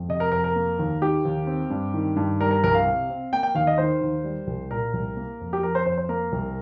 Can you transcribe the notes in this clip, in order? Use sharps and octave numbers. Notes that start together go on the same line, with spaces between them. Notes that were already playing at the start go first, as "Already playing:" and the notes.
Already playing: F2
C3 D#5
A#4
F2 A#4
A#4
A#3
D#2
D#3 G4
D#2
C4
G2
D#3
G2
G3 A#4
A#4
C2 A#4
F5
C3
C4
A#3 G5
G5
D#2 F5
D#5
D#3 C5
D#2
G3
C2
A#2 A#4
C2
A#3
F2
G4
F3 A#4
C5
F2 C5
C5
A#3 A#4
C2